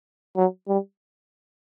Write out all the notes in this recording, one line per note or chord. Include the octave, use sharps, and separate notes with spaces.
F#3
G3